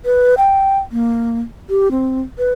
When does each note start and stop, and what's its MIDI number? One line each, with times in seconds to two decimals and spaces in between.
0.05 0.35 71
0.37 0.78 79
0.92 1.39 58
1.69 1.91 67
1.91 2.20 60
2.38 2.52 71